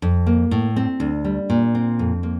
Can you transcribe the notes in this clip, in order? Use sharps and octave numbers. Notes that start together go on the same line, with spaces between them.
F2
A#3
A2
C4
D2
G3
A#2
C4
F2
A#3